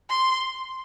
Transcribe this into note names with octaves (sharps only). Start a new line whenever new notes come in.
C6